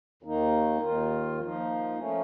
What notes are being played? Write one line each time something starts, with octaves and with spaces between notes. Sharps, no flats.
D#2 D#3 A#3 D#4
D#2 D#3 A#3 F4
F3 A#3 D#4
F3 A3 C#4